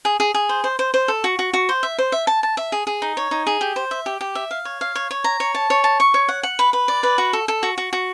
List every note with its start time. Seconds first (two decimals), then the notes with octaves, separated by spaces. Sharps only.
0.05 G#4
0.20 G#4
0.34 G#4
0.49 C5
0.64 C5
0.79 C5
0.94 C5
1.08 A4
1.24 F#4
1.39 F#4
1.54 F#4
1.69 C5
1.83 E5
1.98 C5
2.12 E5
2.27 A5
2.43 A5
2.57 E5
2.72 G#4
2.87 G#4
3.02 D#4
3.17 C#5
3.31 D#4
3.47 G#4
3.61 G4
3.76 C5
3.91 E5
4.06 G4
4.21 G4
4.35 E5
4.51 F5
4.65 C#5
4.81 F5
4.96 C#5
5.11 C#5
5.24 A#5
5.40 C#5
5.55 A5
5.70 C#5
5.84 A5
6.00 C#6
6.14 C#5
6.29 F#5
6.43 F#5
6.59 B4
6.73 B4
6.88 D5
7.03 B4
7.18 F#4
7.33 A4
7.48 A4
7.63 F#4
7.78 F#4
7.93 F#4